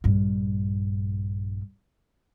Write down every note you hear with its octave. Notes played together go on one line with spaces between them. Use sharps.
A#1 G2